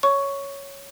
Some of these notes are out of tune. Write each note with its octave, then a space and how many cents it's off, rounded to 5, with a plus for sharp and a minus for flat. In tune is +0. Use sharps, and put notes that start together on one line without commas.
C#5 +0 C#6 +5